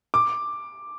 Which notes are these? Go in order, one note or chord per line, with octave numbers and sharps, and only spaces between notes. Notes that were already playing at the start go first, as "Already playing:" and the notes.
D6